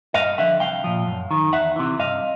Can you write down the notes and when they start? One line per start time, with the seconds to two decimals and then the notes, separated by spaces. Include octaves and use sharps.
0.14 G2 D#5 F5
0.38 D3 F3 E5 F#5
0.60 C2 F5 G5
0.84 A#2 F3
1.07 F#2
1.31 D#3
1.53 E2 E5 F#5
1.76 C3 E3
1.99 G2 D#5 F5